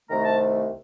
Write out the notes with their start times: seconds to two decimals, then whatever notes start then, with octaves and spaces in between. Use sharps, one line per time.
0.10 C2 C3 D#3 A3 A#5
0.24 A5